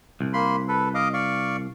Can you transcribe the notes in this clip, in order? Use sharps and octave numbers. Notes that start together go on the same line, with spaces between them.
C2
A#3 B5 C6
A4 B4
D#5 F5 D6
D5 F5 C#6